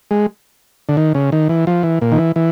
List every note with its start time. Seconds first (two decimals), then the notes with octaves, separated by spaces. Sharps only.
0.11 G#3
0.89 D3
0.97 D#3
1.15 C#3
1.32 D#3
1.49 E3
1.67 F3
1.83 E3
2.01 A#2
2.12 D#3
2.18 E3
2.36 E3